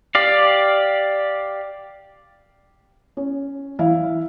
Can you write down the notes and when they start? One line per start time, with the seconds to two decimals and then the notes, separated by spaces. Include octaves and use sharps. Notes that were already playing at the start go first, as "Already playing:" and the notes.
0.15 G4 D5 F5
3.17 C#4
3.79 E3 E4 F5